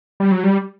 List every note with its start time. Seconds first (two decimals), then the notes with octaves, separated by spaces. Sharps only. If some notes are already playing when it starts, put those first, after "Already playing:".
0.20 G3
0.32 F#3
0.43 G3